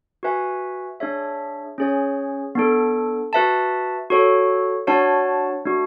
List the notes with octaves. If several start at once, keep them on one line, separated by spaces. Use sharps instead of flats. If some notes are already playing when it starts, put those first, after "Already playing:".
F#4 B4 E5 G#5
D4 G#4 C#5 E5
C#4 G#4 C#5
B3 D4 A4
F#4 B4 E5 A5
F#4 A4 C#5
D4 F#4 C#5 F#5 A5
A3 D4 F#4